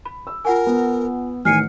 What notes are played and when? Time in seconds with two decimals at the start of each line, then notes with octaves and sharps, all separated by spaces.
0.05 B5
0.27 E6
0.45 F4 A#4 F#5 G#5
0.67 B3
1.45 A1 D#3 G#5 F6 C7 C#7